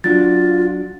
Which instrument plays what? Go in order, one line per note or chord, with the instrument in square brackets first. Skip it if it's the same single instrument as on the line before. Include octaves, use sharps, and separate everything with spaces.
[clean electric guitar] F#3 D4 F#4 [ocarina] F4 [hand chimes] A6